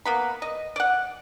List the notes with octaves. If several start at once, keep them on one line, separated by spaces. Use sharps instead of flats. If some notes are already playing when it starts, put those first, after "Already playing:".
A#3 B3 B5
D#5
D5 F#5